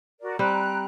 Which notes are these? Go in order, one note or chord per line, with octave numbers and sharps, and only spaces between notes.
F#4 A#4 D5
G3 C4 G5 A#5 F#6